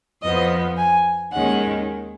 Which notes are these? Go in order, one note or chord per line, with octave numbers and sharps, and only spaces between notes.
F2 F3 B3 D#5
G#5
D#2 D#3 G#3 C#4 F#5